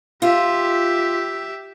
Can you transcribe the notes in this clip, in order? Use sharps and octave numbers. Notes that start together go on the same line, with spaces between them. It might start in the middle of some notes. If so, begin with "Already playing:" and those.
F4 G4 E5